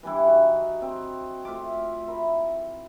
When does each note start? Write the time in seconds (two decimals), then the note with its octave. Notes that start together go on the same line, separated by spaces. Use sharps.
0.03 E3 G3 D4 E4
0.26 D#4 F#4 F#5
0.82 C4
1.45 A3 F4 E5 D6
2.08 E4 A#4